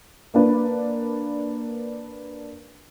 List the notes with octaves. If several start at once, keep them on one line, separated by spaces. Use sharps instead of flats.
A#3 D4 B4